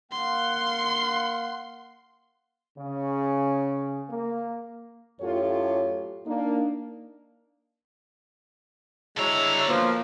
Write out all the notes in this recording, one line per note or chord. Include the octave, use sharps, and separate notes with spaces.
A#3 F5 F#5 C6
C#3
A#3
F#2 A2 F4 G4 A4 C#5
A#3 D4 D#4
D3 F#3 G#3 E4 C#5 A#5
B2 F3 A#3